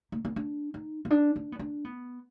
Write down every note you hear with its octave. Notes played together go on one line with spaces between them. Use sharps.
A#3
B3
D4
D#4
B3
D4
D4
B3
D4
B3